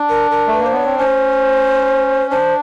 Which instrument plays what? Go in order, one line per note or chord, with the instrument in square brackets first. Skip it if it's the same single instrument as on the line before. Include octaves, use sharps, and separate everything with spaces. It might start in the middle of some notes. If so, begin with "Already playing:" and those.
Already playing: [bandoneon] D4
[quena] A#4
A#4
[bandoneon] A3
[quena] B4
[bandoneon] A#3
[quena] C5
[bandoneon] B3 [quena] C#5
[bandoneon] C4
[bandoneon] C#4 [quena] C5
[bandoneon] D4 [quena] C5